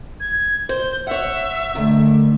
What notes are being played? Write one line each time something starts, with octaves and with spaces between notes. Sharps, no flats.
G#6
C5 G6
C#5 E5 F#5
D3 D#3 A3